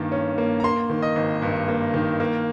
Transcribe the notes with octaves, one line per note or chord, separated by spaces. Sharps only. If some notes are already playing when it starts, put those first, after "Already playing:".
Already playing: G2 D#3 A#3
C#4
A#3
A#5
A#3 C6
D#3
D#5
G#1
G2
A#3
D#3
A#3